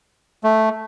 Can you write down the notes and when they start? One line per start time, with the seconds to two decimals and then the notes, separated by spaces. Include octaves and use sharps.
0.44 A3